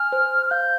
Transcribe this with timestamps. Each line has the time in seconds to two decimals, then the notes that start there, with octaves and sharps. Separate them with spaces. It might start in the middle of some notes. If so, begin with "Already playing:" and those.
Already playing: G#5 F6
0.12 C5
0.46 F6
0.51 F5 G6